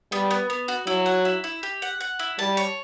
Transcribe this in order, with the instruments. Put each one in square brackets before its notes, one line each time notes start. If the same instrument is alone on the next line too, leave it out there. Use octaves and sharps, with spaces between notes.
[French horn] G3 [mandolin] B3
[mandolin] B3
B3
F#4
[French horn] F#3 [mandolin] E4
[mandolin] F#5
E4
E4
G4
F#5
F#5
E4
[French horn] G3 [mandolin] A5
[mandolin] C#5